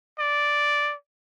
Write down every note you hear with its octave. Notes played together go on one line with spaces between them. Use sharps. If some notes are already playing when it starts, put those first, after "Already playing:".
D5